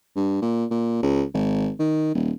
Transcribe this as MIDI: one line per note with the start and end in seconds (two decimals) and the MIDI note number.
0.16 0.38 43
0.42 0.65 46
0.70 1.01 46
1.03 1.24 37
1.34 1.70 32
1.79 2.12 51
2.14 2.32 27